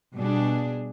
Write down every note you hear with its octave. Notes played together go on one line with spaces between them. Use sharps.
B2 G3 D4 G#4